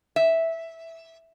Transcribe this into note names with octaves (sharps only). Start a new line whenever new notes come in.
E5